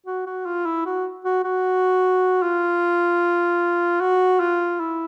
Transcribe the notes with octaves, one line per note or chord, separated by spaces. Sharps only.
F#4
F#4
F4
E4
F#4
F#4
F#4
F4
F#4
F4
E4